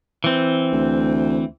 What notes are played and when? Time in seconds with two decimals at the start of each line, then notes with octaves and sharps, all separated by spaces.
0.24 E3 C4
0.72 D2